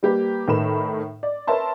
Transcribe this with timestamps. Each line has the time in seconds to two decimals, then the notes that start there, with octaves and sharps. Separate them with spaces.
0.03 G3 A#3 G4 B4
0.48 A2 D#3 A#4 B4 B5 E7
1.23 D5
1.47 A#4 B4 C#5 E5 A5 C6